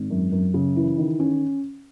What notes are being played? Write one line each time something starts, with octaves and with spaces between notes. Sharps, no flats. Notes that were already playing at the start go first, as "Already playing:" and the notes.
Already playing: G#1
F#2
F#2
C#3
E3
D#3
C#4